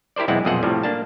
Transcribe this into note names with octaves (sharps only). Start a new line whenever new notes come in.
E4 G4 A#4 C5 D5
B1 E2 G#3 C4 E4 F#5
B1 F2 A#2 G#4 C5 F#5
A2 C3 F3 G3
A#3 D4 A5